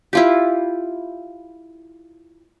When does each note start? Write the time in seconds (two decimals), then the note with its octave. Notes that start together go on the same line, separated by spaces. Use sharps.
0.13 E4 F4 G4